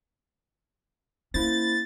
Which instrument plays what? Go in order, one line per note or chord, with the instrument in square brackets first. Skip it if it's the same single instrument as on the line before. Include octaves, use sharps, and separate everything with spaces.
[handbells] A#3 E4 C5 [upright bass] C#4 [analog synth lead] A6